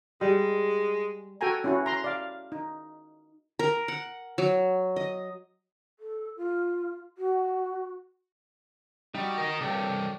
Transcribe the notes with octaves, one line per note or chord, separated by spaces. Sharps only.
G3 G#3
F#4 A4 G5 G#5 A#5
C#4 E4 F#4
A#5 C6
D5 F5
D#4
A#4
F#5
F#3
D#5
A4
F4
F#4
G3 D#4 F#4
A#4 D#5
C2 G2 A4 D5 G5